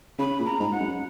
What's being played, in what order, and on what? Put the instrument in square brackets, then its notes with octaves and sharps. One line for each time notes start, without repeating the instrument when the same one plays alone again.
[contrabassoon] C#3 [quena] B5
[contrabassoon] A#2
[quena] A#5
[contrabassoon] G#2
[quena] F#5
[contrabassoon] F#2